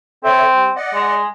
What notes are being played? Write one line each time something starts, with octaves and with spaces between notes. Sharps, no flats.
C4 A4 C#5 E5
G3
D5 D#5 F#5
G#3